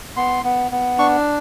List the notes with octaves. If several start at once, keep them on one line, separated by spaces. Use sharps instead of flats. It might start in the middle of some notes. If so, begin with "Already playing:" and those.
B3 C6
B3
B3
D4 C#6